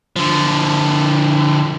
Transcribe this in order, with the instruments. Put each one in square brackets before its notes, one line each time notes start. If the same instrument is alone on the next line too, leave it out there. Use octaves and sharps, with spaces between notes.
[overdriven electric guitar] D3 F3